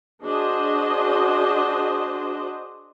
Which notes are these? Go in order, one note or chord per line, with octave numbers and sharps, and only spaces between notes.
D4 F#4 G#4 C5 D#5